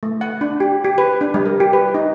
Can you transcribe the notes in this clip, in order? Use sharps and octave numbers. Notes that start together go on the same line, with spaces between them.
A3
F#5
D4
G4
G4
B4
D4
G3
A#4
G4
B4
D#4